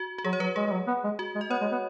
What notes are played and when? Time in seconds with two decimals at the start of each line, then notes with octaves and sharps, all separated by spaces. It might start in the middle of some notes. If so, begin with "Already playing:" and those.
Already playing: F#4
0.18 F#4
0.25 F#3 G#4
0.33 C#5
0.40 F#3 B4
0.56 G#3 G#4
0.67 G#3
0.72 F#3
0.87 B3
1.04 G#3
1.19 F#4
1.35 G#3
1.41 D#5
1.50 B3 C#5
1.61 G#3
1.72 B3